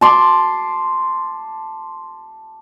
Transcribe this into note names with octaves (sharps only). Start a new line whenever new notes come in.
A5 C6 D6